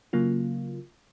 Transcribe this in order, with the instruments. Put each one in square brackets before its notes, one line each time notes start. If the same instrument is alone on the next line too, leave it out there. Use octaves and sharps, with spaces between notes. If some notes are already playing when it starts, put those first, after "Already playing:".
[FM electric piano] C#3 F#3 A#3 F4